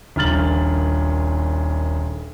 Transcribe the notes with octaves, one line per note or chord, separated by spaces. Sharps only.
D#1 A#1 F6 A6 F#7